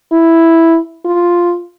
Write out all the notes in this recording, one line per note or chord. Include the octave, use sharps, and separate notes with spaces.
E4
F4